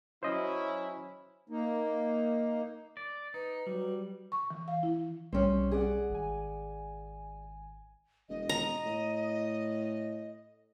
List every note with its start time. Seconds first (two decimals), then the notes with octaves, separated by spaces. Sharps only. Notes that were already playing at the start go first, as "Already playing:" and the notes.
0.23 F#3 C#4 E4 C5 D#5
1.49 A#3 D#4
2.97 D5
3.34 D#4 B4
3.67 F#3 G3
4.32 C#6
4.50 E3
4.68 F5
4.83 E4
5.33 B1 G3 C4 C#4
5.71 G#4 D5 F#5
6.10 G#1 G#5
8.29 E1 D#5
8.49 A#5
8.85 A2